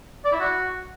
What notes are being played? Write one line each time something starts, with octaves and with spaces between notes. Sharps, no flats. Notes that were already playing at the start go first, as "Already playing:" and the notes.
D5
E4
F#4